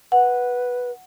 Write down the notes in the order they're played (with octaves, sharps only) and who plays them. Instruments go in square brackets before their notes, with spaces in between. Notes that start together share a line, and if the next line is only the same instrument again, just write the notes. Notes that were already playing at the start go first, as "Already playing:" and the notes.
[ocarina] B4 [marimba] F#5